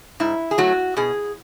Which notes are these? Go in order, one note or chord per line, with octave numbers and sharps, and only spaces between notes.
G#2 E4
G#4
F#3 A3 F#4
B2 G#4